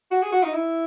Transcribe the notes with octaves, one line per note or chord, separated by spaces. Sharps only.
F#4
G#4
F#4
D#4
E4